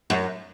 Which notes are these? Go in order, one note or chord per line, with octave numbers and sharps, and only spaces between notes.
F#2